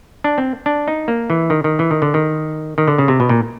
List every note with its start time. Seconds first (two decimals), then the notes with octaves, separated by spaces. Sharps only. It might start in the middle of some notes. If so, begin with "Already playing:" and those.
0.24 D4
0.38 C4
0.66 D4
0.88 D#4
1.08 A#3
1.30 E3
1.50 D#3
1.64 D#3
1.79 E3
1.91 D#3
2.02 D3
2.14 D#3
2.78 D#3
2.88 D3
2.98 C#3
3.08 C3
3.20 B2
3.29 A#2